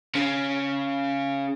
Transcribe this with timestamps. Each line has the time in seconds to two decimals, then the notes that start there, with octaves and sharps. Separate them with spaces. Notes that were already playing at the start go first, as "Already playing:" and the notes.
0.15 C#3